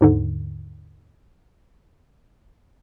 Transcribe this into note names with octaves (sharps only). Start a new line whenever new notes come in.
D#2 G#2 D3